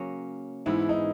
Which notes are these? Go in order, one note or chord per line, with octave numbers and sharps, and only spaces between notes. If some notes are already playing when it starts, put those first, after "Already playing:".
Already playing: C#3 F#3 A#3 C#4
G#2 E3 G#3 B3 E4
D#4